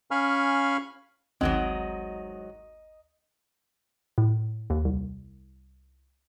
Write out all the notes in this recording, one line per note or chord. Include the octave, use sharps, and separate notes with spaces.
C#4 F5 G#5 B5 C#6 F6
G#1 D2 G#2 D#3 F#3 C4 D#5
A2
D#2
C2